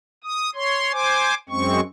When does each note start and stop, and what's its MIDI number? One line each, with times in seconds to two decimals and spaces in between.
0.24 0.50 87
0.55 0.92 73
0.55 0.92 84
0.92 1.34 72
0.92 1.34 80
0.92 1.34 86
1.49 1.80 42
1.49 1.80 56
1.49 1.80 60
1.49 1.80 85